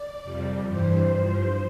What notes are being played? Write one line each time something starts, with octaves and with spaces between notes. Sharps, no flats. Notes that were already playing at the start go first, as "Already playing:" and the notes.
Already playing: D5
F2 C3 G3
G2 E3 G3 C5
G2 F3